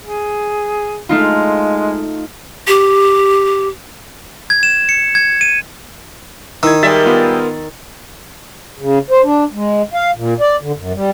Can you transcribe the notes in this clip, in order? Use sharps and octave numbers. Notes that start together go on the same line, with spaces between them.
G#4
G#3 A3 D#4 F4
G4
G#6
E7
C#7
G#6
D#7
D#3 E4 E6 G#6
G3 G#3 A#4 E5 A6
B3 F4
C#3
C5
D4
G#3
F5
A#2
D5
D3
F#2
G3